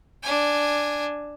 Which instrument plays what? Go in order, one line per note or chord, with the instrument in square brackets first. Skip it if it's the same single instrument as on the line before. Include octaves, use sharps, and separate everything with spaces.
[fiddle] D4 G#5